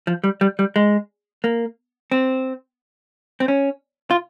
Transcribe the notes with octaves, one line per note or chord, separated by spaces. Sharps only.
F3
G3
G3
G3
G#3
A#3
C4
C4
C#4
F4